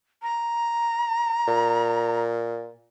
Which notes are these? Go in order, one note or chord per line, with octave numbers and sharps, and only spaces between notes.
A#5
A#2